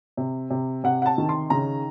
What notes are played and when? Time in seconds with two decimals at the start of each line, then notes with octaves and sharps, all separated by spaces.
0.17 C3
0.50 C3
0.84 C3 F#5
1.02 F#5
1.06 A5
1.18 D#3
1.29 C6
1.50 C#3 A#5